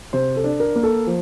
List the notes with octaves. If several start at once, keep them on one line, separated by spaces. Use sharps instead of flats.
C3 C5
A4
D4
A#4
A#3
A4
F3